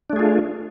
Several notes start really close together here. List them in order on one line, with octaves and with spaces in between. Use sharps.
D4 A3 G#4 F4